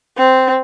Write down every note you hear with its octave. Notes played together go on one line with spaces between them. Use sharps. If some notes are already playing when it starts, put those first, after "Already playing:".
C4